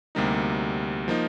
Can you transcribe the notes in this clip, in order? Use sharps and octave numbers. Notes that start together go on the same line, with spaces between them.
D2 C3 G3 A#3 D#4
F3 A#3 D#4